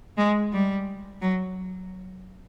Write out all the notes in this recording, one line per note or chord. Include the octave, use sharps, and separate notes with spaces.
G#3
G3
F#3